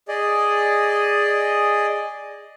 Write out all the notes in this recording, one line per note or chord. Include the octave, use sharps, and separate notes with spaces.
G#4 D5 D#5